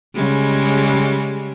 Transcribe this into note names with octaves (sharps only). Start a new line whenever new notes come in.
C#3 G3 G#3